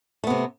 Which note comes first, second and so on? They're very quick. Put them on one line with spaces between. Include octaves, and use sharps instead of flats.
A3 B3 C3